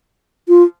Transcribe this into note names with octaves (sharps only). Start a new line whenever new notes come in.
F4